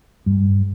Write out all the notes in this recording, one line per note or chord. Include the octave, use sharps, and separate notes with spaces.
G2